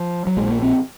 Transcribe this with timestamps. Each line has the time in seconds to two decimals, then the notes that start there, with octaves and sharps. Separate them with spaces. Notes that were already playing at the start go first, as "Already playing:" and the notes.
Already playing: F3
0.27 F#3
0.37 A#1 A#2 G#3
0.49 A#3
0.62 C4